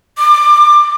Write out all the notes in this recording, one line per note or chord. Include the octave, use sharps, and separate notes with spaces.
D6